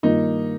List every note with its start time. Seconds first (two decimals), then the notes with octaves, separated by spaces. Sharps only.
0.03 G2 D#3 A#3 D#4 F4